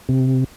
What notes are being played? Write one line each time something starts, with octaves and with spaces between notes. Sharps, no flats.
C3